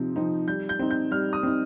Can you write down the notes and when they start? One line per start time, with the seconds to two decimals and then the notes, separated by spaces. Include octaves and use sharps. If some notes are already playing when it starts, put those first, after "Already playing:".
Already playing: C3 F3 C4 D#4
0.16 F3 C4 D#4
0.48 G3 G6
0.69 G6
0.79 C4 D#4
0.90 G6
1.11 G3 F6
1.33 D#6
1.43 C4 D#4